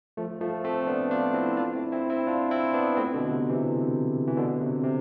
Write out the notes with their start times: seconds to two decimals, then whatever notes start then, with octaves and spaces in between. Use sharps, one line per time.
0.17 F3 A3
0.41 F3 A3
0.64 A3 C4
0.87 B3 D4
1.11 D4 F4
1.34 C4 E4
1.57 D4 F4
1.75 C4 E4
1.92 C4 E4
2.10 C4 E4
2.27 D4 F4
2.51 C4 E4
2.73 B3 D4
2.97 A3 C4
3.14 B2 D3
3.32 C3
3.50 C3 E3
4.27 E3
4.37 B2 D3
4.61 C3
4.83 C3